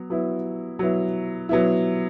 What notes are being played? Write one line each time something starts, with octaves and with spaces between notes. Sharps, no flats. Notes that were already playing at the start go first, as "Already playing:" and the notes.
Already playing: F#3 B3
F#3 B3 E4
F#3 B3 E4
F#3 B3 E4